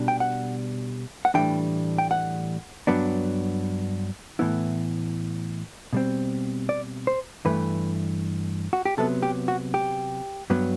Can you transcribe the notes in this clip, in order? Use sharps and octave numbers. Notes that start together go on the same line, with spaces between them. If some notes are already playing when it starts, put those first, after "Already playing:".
Already playing: B2 G3 D4
G5
F#5
F#5
A2 E3 G3 D4 G5
G5
F#5
G2 F#3 B3 D4
A2 E3 B3 E4
B2 G3 C4
D5
C5
G2 E3 A3 B4
F#4
G4
C3 F#3 B3 A4
G4
F#4
G4
G2 F#3 B3